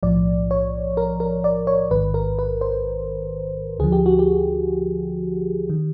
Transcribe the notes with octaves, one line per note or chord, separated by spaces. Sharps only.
B1 A2 F3 D5
C#5
A#4
A#4
D5
C#5
A1 G#2 D#3 B4
A#4
B4
C5
D2 D3 F3 G#4
G4
F#4
G4
D#3